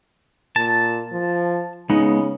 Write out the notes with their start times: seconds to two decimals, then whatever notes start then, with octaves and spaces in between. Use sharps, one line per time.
0.56 A#2 A5
1.12 F3
1.90 C#3 G#3 B3 D#4